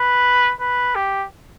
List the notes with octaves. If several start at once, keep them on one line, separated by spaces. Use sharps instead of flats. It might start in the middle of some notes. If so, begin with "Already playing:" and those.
Already playing: B4
B4
G4